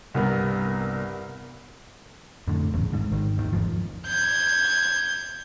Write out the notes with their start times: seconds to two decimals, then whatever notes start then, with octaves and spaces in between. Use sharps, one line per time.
0.14 C2 G2 B3 A#4
2.48 F2 A2 D3
2.73 D1 G#1 E2 C#3
2.93 G#1 G#2
3.12 G#1 D#3
3.37 G#1 D#2 D#3
3.53 G1 E2 G#2 F3
4.08 G6 G#6